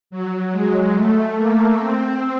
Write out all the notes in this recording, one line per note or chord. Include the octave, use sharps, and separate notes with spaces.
F#3
G#3
A3
A#3
C4